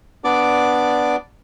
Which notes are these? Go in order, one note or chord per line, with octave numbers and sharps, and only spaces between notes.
B3 D4 D5 D6